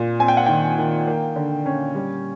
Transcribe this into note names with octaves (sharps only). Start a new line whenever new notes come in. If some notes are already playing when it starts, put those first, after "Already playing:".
Already playing: A#2
C4 G#5
G5
F#5
D#3 G5
D#3
A#3
D3
C#4
G3